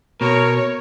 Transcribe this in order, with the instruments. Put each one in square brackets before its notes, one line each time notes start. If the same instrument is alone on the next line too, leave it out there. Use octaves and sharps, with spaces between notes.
[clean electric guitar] B2 [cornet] A#4 [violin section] C#5